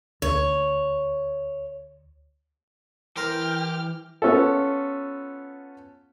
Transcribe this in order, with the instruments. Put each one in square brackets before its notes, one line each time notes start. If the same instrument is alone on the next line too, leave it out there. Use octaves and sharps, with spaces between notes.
[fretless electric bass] D2 [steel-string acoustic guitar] C#5
[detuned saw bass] E3 [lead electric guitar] G4 [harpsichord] A#4 C5 G5 [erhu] F6
[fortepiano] B3 C#4 F4 A4